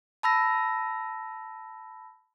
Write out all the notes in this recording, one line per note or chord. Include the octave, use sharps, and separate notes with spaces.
A5 B5 E6 A#6